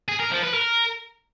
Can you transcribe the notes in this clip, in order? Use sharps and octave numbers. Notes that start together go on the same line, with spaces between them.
G#4
A#4
F3
B4
A#4